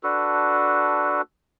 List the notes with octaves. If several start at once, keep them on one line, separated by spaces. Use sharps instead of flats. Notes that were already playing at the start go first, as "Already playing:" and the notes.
D4 F#4 A4 B4